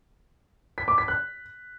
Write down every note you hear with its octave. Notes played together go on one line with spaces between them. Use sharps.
B6
D6
B6
F#6